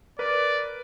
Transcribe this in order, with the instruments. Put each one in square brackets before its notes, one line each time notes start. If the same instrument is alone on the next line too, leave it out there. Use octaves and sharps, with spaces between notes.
[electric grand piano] A#4 B4 [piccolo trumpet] D5